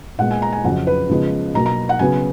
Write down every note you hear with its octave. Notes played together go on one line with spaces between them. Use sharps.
A#2 G#3 B3 F#5
G#5
A#5
G#5
F2 C#3 F#3 F#5
B4
C#3 F3 G#3 B3
B2 F#3 A#3 A#5
A#5
F#5
C#3 F#3 B3 G#5